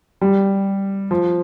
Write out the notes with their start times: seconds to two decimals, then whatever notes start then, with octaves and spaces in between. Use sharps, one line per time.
0.21 G3
1.11 F3